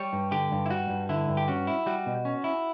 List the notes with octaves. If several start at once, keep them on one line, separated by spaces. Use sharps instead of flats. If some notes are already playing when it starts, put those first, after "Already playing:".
Already playing: G3 C#5
G2
D3 G4
G2
E4
G3 F#4
G2
D3 E4
G2
G4
C#4 F#4
E4
G3 F#4
B2
C#4
E4